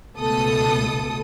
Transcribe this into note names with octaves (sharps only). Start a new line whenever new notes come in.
C#2 B2 A3 A4 D#6